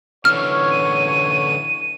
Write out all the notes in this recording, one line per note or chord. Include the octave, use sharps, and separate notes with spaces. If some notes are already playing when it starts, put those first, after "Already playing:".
D3 E3 C#5 F6
D#7